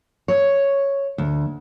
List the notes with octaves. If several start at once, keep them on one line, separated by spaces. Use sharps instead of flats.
C#5
D2